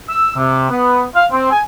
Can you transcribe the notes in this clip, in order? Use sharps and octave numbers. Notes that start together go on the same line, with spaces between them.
E6
C3
B3
F5
C4
G#5